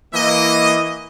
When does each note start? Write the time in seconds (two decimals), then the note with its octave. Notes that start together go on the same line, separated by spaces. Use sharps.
0.13 E3 A#3 D#5